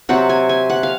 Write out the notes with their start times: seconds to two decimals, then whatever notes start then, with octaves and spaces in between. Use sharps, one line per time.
0.09 C3 F#3 C4 F#5
0.29 G#5
0.49 G#5
0.70 F#5
0.83 F5